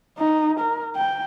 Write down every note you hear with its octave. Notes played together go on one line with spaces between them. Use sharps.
D#4
A#4
G5